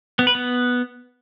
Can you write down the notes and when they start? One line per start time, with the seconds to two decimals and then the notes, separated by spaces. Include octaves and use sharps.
0.19 B3
0.27 B4
0.35 B3